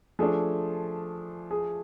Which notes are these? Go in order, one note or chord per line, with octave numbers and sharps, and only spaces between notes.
F3 A3 D4 G#4
G#4